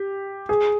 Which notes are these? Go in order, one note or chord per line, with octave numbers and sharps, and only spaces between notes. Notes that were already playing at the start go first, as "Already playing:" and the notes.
Already playing: G4
G#4